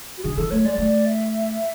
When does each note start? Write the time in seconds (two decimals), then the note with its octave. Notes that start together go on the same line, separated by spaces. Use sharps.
0.18 F#4
0.24 D3 G#4
0.37 E3 A4
0.51 A3 C#5
0.64 G#3 D5
0.78 A3 D5
1.06 E5